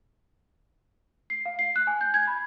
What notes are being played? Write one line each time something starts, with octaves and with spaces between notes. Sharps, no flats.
C7
F5
C7
F#6
G#5
G6
G#6
B5